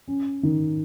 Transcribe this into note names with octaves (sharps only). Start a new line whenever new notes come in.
C#4
D#3